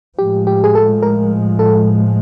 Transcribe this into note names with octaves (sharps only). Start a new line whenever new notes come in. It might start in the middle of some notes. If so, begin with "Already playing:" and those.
A2 F3 G#3 G4
G4
G#4
A4
A#4
A4